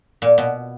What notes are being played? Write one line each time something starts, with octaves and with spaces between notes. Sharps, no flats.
A#2
B2